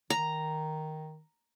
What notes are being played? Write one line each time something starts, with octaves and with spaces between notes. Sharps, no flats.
D#3 A#5